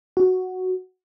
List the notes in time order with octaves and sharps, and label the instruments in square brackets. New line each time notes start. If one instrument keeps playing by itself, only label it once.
[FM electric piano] F#4